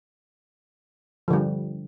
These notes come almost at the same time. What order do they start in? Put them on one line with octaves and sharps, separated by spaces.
F3 D3 G3